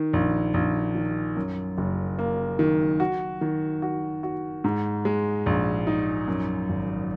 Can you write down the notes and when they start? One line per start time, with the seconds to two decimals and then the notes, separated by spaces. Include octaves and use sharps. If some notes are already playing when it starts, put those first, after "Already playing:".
Already playing: D#3
0.13 A#1
0.54 A#1
0.95 D#3
1.37 F#2
1.78 F#1
2.19 A#3
2.59 D#3
3.00 F#4
3.41 D#3
3.82 F#4
4.23 F#4
4.64 G#2
5.05 G#3
5.46 A#1
5.87 D#4
6.28 F#2
6.69 G#1